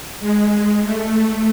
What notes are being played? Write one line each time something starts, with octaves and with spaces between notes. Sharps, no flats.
G#3
A3